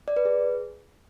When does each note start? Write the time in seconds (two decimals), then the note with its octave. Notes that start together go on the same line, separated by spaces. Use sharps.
0.08 D5
0.16 B4
0.25 G#4